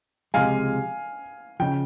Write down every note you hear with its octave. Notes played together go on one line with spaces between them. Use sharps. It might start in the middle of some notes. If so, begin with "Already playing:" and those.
C#2 C3 F3 G#3 F5 G#5
C#3 F3 G5